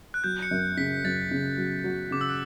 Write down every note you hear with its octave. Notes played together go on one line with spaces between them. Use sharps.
F#6
F#3 G6
C#7
F#2
C#3 B6
F#2 A6
C#3
F#3
F#3
C#3 D6
E6
F#6